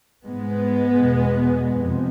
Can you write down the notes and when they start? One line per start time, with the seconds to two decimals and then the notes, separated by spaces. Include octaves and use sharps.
0.24 G#2 G#3 B3
1.00 E2 B2
1.77 F2 C3